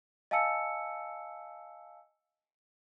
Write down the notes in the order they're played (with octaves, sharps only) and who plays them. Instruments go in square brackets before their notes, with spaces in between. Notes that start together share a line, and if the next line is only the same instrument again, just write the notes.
[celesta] D#5 F5 G#5 A5 E6 C#7